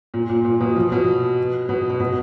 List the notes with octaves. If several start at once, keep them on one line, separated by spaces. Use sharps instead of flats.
A#2
A#2
A#2
B2
F3
B2
B2
B2
B2